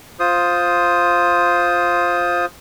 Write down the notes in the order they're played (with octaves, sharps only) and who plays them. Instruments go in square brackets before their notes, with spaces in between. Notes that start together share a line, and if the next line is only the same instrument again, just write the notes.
[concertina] F4 C5 D#6